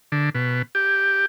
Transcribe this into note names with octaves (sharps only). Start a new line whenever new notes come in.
D3
B2
G4